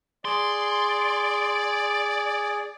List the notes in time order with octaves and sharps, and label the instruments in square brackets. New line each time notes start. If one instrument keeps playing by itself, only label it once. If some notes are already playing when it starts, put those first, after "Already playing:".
[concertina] G#4 [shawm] D5 [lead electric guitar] C6